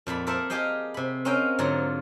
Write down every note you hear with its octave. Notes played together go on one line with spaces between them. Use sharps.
F2 A#2 D5 B5
A4 A#4 C5 D5 E5 A5
G4 G#4 D#5 F5 G5
C3 B5
C4 C#4 A#4 D#5 F5 G5
G#2 D3 F#3 F4 A#5